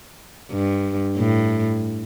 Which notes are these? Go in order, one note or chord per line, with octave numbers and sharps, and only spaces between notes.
G2
A2